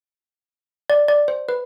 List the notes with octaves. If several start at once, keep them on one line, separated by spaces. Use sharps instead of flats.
D5
D5
C5
B4